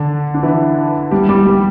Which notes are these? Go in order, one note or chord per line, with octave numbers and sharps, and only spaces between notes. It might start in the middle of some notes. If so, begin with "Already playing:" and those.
Already playing: D3 D4
D4
E3 E4
G3 G4
G3 G4
G3 G4